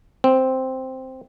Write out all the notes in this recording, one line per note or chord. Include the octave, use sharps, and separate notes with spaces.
C4